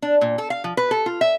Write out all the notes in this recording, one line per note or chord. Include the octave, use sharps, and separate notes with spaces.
D4
A#2
A4
F5
F3
B4
A4
F4
E5